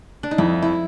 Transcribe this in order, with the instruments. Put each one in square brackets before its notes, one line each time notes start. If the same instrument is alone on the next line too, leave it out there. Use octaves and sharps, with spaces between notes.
[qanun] D4
D#4
[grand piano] F2 [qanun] E4
[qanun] E4